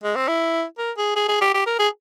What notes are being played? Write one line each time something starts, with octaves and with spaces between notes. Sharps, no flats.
G#3
C4
E4
A#4
G#4
G#4
G#4
G4
G4
A#4
G#4